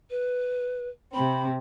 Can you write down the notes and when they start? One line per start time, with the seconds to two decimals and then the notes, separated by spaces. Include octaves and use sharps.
0.10 B4
1.14 C3 C4 B5